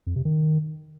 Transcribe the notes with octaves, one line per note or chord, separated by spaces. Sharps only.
F2
C3
D#3